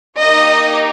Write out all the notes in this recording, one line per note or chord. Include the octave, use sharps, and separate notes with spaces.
A#3 D#4 G4 D#5